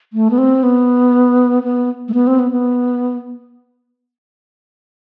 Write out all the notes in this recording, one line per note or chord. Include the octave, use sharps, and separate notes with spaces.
A3
B3
C4
B3
B3
A3
B3
C4
B3
B3